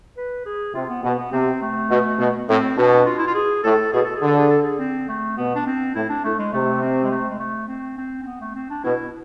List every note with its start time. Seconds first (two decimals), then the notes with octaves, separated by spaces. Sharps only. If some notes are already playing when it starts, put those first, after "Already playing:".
0.17 B4
0.46 G#4
0.74 C3 F4
0.89 B3
1.03 B2 B3
1.18 B3
1.33 C3 C4
1.62 A3
1.90 B2
2.19 B2
2.48 A2 C4
2.77 B2 D4
3.06 F4
3.19 E4
3.27 F4
3.35 G#4
3.64 A2 A4
3.93 B2 G#4
4.05 A4
4.16 G#4
4.22 D3
4.27 A4
4.39 G#4
4.50 A4
4.62 G#4
4.79 C4
5.09 A3
5.37 B2 B3
5.55 D4
5.66 C4
5.95 A2 E4
6.10 D4
6.24 A2 A3
6.39 G#3
6.53 C3 A3
6.82 C4
7.03 G#3
7.11 A3
7.29 G#3
7.39 A3
7.68 C4
7.98 C4
8.22 C4
8.26 B3
8.41 A3
8.55 C4
8.70 D4
8.84 B2 E4